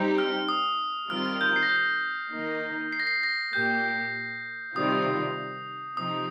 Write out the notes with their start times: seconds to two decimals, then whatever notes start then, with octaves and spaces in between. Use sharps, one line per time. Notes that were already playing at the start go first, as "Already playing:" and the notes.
Already playing: G3 C4 D#4 G4
0.18 F6
0.49 D#6
1.10 D#3 G3 C4 F4 A#4 F6
1.26 F6
1.41 G6
1.56 C7
1.63 A#6
1.69 G6
1.76 A#6
2.32 D#3 A#3 D#4
2.93 C7
3.00 A#6
3.07 C7
3.23 A#6
3.53 A#2 A#3 G4 G6
4.75 C3 D#3 G3 C4 F4 D#6
5.97 C3 F3 C4 D#4 D#6